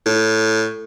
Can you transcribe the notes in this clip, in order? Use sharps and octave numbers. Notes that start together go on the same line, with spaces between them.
A2